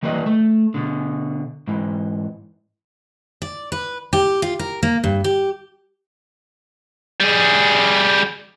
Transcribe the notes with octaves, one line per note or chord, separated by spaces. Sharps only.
D#3 E3 G3 A#3 B4 D#5
A3
B2 D3
G#2 E3
D5
B4
G4
F4
A#4
A#3
G2
G4
G3 G#4